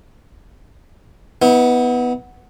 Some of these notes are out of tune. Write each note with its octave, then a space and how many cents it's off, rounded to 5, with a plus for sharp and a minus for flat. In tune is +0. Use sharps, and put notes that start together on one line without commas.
B3 +0 E4 -45